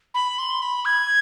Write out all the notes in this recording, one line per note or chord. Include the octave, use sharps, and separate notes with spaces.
B5
C6
B5
G#6